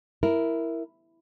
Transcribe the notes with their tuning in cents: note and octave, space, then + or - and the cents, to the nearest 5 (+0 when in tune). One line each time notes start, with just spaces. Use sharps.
E4 +0 A#4 +0